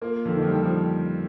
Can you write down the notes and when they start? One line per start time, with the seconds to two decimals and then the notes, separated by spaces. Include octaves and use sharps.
0.01 A#3 F4
0.25 F2 D3
0.35 D#3
0.42 F3
0.49 D#3 G3
0.65 F3